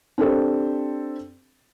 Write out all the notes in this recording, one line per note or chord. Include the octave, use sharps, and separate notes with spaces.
C4 D4 G4 A4 C5